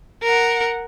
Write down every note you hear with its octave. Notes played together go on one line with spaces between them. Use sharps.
A#4 F#5